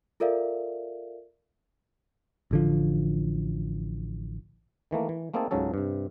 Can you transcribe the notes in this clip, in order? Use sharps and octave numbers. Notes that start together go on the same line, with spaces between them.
F4 A4 A#4 D5 E5 F5
A1 D3 F3
D#3 E3 A3 A#3
E3
A3 A#3 C4 D#4 G#4 A4
C#2 G#2 C#3 F#3 C#4 A4
G2 C3